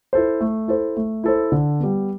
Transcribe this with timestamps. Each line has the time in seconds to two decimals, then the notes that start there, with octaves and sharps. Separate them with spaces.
0.13 E4 A4 C5
0.41 A3
0.68 E4 A4 C5
0.97 A3
1.24 E4 A4 C5
1.52 D3
1.79 G3 B3